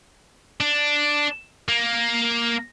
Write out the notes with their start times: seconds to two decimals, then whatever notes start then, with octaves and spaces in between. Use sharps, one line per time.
0.61 D4
1.69 A#3